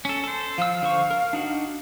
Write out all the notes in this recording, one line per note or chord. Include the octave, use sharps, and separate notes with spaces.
C#4 A4
A4 C5
F3 F5 E6
D3 C5 C#6
A#4
D4 D#4 F#4